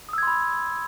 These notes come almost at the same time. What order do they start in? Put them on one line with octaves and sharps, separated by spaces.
D#6 E6 G#6 C6 B5